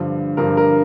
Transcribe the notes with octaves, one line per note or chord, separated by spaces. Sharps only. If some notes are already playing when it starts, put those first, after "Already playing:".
Already playing: G2 D3 F3
G2 D3 F3 A#4
A#4